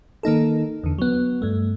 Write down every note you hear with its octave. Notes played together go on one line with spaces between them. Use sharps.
D#3 A#3 D#4 A4
E2 D3
F#3 B3
G2 A3